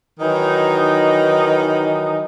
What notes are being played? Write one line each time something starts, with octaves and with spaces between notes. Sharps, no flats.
D#3 E3 F#3 D#4